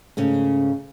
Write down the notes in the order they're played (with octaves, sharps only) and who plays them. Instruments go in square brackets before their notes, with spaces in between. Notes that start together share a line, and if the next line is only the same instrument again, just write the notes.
[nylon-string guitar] G#2 C#3 A3 C#4